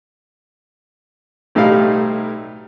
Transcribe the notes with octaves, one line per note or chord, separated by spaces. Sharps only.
B1 A2 G3 D#4 E4 F5